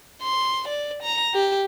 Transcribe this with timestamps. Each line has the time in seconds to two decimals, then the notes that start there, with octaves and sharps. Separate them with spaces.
0.22 C6
0.68 D5
1.03 A#5
1.34 G4